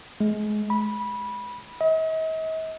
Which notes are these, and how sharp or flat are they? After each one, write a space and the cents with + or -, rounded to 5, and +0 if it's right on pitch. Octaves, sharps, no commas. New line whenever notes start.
G#3 +25
B5 -15
D#5 +45